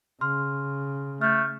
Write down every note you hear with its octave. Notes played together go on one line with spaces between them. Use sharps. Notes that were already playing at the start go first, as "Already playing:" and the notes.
C#3 C6 F6
A3 F6 G6